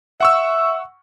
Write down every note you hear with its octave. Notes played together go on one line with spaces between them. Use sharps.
E5 F#5 C#6 E6